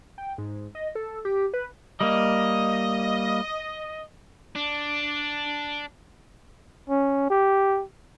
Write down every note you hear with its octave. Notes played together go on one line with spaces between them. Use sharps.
G5
G#2
D#5
A4
G4
B4
G3 A#3 D#5
D4
C#4
G4